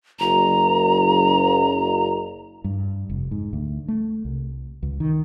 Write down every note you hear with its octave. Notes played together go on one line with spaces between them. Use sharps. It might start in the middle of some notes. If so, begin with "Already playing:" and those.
F#1 A#5
G2
F1
G#2
D2
A3
C2
C#2
D#3